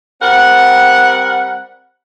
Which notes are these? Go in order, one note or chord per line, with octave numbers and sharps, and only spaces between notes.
G3 C4 A#4 F#5